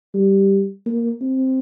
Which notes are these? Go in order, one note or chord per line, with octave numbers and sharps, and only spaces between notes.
G3
A#3
C4